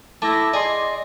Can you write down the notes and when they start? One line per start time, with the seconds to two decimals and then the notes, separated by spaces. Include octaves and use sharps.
0.22 A3 E4 A5 D6 A#6
0.54 G#4 D5 D#5 G#5 C6